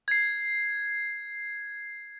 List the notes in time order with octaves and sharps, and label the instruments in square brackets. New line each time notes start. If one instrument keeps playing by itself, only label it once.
[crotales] G#6 C7